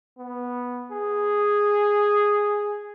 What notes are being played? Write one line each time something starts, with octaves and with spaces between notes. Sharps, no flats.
B3
G#4